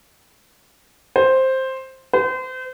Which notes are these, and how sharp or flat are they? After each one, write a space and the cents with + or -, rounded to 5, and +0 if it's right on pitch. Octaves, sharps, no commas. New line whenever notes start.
C5 +5
C5 -35